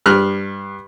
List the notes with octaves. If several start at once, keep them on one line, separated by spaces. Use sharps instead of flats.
G2 F6 F#6